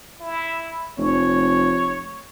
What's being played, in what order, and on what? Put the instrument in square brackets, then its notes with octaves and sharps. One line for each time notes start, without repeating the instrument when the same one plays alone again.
[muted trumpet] E4
[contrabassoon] F1 [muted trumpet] C#5